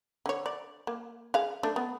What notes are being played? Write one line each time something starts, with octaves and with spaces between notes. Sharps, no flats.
D3 C#5
D5
A#3
G#4 F5
A3 D4
B3